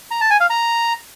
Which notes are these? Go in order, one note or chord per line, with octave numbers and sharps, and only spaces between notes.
A#5
A5
G#5
F5
A#5